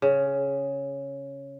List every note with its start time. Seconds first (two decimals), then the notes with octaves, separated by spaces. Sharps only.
0.02 C#3